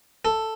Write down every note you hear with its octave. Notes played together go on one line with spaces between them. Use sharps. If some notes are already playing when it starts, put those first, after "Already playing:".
A4